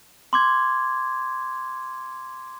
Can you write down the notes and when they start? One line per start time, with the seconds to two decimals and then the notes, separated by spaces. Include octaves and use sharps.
0.33 C6 D6 G#6